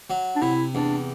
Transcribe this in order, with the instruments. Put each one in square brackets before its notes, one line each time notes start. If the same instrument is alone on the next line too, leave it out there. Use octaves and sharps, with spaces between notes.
[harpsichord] F#3
[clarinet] D4
[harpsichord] C3 [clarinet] E4
[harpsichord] E2 [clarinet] D4